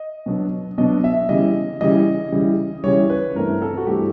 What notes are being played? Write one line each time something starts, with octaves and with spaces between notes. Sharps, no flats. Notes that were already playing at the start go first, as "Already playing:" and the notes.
Already playing: D#5
B2 F#3 B3 D4
B2 F#3 B3 D4 D#5
E5
C#3 E3 G3 D#5
C#3 E3 G3 D#5
C#3 E3 G3
C#3 E3 G3 C#5
B4
G2 E3 A3 C4 A#4
A4
F#4
G2 E3 A3 C4 G4